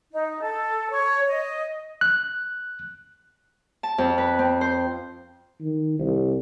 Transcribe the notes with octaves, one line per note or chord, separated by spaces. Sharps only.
D#4
A4
C#5
D#5
F#6
A5
F2
B4
C4
C5
D#3
C2